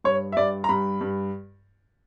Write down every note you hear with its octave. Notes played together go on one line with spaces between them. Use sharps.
G2 C#5
E5
G2 D5
A#5
G2 B5
G2